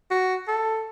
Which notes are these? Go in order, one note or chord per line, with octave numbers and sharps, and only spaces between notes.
F#4
A4